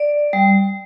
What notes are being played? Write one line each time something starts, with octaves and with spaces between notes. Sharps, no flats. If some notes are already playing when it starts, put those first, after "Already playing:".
Already playing: D5
G3